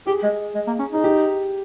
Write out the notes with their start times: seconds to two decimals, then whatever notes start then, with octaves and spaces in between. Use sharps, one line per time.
0.07 G4 G#4
0.23 G#3
0.55 G#3
0.67 A#3
0.79 C#4
0.92 D#4 G#4
1.04 G4